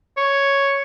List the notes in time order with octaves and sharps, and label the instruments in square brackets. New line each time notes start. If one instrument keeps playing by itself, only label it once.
[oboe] C#5